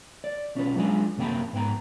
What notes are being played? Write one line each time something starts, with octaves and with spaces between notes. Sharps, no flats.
D5
B1 C#4 F4 B4
F#3 G#3 D4 F4 G#5
F#2 C3 A#3 G5 B5
G#2 B3 G5 A#5